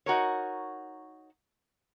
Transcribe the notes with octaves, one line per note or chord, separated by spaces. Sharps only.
D#4 F#4 A#4 C#5